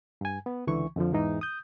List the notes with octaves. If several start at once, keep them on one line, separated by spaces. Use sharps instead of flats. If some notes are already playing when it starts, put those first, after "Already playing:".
G2 G#5
B3
C#2 D3 E3 C#6
F2 D3 F3
E2 G#2 E3 D#4
D#6 G6